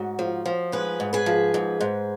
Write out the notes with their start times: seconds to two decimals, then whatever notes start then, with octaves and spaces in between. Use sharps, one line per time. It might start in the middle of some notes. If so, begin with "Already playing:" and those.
Already playing: G#2 F#4
0.19 F3
0.46 F3
0.72 G#2 G#4 B4
1.00 G#2
1.13 G#4 B4
1.26 F3
1.54 G#2
1.80 G#2